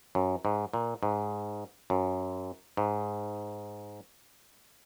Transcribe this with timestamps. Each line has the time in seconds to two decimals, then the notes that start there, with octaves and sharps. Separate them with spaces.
0.15 F#2
0.45 G#2
0.74 A#2
1.03 G#2
1.90 F#2
2.77 G#2